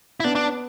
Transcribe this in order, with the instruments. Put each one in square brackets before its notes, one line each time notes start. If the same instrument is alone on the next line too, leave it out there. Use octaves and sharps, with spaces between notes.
[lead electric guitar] E4
[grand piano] B3 [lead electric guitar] D4
[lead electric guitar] D4